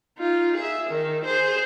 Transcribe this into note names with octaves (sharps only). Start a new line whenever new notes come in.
D#4 F4
G#4 E5
D#3 D#4
G#4 C5